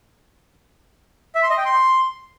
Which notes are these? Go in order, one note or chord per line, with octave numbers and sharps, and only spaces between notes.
E5
C6
D#5
G5
C6